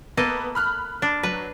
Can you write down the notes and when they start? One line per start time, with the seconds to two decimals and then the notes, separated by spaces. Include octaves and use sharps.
0.17 A#3 B3 A4 D#5
0.55 B5 F6 F#6
1.02 D4
1.23 F#3 B4